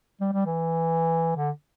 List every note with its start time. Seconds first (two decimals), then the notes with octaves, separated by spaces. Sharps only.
0.20 G3
0.32 G3
0.46 E3
1.36 D3